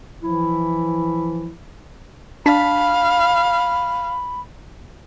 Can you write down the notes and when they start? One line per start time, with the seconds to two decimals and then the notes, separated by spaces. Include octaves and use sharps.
0.22 E3 F3 E4
2.46 D4 F5 A5 B5 B6